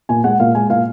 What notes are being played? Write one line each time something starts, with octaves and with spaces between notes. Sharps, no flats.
A#2 G#5
G#3 F#5
A#2 F5
G#3 G#5
A#2 F5